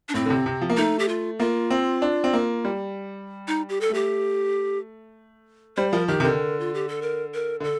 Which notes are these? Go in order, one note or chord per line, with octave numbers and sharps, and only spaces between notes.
D4
A2 C4
D3
C3
C3
F3
A#3
A3 D#4
G4
F4
A#3 F4
C4
D4
C4
A#3
G3
D#4
G4
A4
A3 G4
G3 C5
F3 A#4
D#3 G4
C3
D3 A#4
F4
G4
A4
A#4
A#4
D3
A4